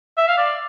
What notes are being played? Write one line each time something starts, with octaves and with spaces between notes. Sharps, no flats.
E5
F5
D5